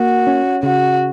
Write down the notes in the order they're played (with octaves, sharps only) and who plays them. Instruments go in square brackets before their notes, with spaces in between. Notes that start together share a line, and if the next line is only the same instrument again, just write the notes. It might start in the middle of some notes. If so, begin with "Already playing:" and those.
Already playing: [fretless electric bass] A#3 [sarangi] F#4
[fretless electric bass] C#4
[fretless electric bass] C#3 [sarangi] F#4